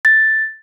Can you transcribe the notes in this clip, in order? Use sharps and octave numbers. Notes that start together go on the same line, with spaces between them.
A6